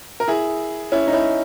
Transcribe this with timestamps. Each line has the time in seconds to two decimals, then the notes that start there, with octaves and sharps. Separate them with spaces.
0.20 A#4
0.28 E4 G#4
0.92 C#4 E4
1.07 D#4
1.13 C#4 E4